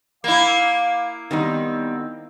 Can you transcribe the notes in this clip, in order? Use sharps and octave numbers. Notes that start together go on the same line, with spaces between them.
A#3 E4 F5 D6
D#3 G3 B3 C4 D#4